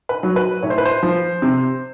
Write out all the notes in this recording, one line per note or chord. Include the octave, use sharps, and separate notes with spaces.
B4
F#3
B4
A2 C#5
C5
B4
C5
F3
C3